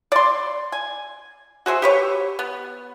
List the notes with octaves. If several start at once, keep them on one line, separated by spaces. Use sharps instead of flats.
D5 C6
G#5
F#4 G#4 C5 E5
G4 B4 C#5
B3